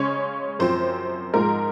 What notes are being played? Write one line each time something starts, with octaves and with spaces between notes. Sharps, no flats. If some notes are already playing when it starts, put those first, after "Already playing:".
Already playing: C#3 G#3 C#4 C#5
F#2 F3 C4 C5
G#2 F3 G#3 A#4